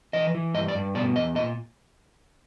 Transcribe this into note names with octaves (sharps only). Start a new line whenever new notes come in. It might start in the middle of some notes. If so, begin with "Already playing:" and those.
E3 D#5
E3
G2 D#5
D5
G2
B2 D5
E2 D#5
A#2 D#5